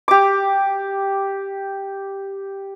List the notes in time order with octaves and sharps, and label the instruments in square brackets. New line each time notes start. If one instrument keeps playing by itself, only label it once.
[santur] G4 D6